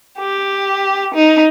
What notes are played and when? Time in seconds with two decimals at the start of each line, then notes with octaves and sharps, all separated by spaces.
0.20 G4
1.15 D#4